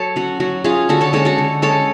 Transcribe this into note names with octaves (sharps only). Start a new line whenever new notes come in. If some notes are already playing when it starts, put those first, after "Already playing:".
Already playing: F#3 A4 C#5
C#4 F#4
F#3 F#4
C#4 F4 G#4
D3 F#4 A4
A4 C#5
G#3 C#4 A4 C#5
F#4 A4
D3
G#3 C#4 A4 C#5